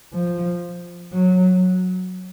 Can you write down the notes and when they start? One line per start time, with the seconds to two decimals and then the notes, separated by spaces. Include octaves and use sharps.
0.13 F3
1.13 F#3